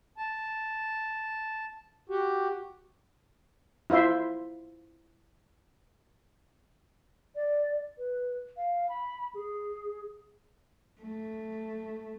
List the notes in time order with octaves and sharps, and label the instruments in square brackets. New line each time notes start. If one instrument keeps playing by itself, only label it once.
[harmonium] A5
F#4 G4
[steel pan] E4 F4 C5 E5 C6
[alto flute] D5
B4
F5
B5
G#4
[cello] A3